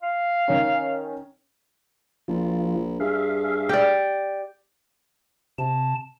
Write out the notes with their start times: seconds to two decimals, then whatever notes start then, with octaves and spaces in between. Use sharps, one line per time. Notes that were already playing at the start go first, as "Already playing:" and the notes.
0.02 F5
0.48 D#3 C#4
2.28 A#1 F3 F4
3.00 G2 G#4 E5 F5
3.69 G4 D5
5.58 C3 A5